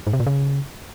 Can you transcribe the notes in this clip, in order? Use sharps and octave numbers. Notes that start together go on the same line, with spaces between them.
G#2
C3
A#2
C#3